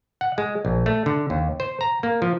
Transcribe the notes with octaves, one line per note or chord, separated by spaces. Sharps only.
F#5
G#3
A#1
A3
D3
D#2
C5
A#5
A#3
F3